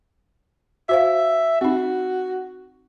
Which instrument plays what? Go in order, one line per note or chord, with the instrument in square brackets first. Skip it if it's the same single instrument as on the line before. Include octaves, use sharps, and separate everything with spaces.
[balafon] F#4 C5 F5 [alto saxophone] E5
[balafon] C4 D#4 [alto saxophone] F#4